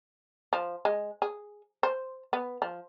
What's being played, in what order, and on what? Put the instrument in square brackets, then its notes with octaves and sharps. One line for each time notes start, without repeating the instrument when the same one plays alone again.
[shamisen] F3
G#3
G#4
C5
B3
F3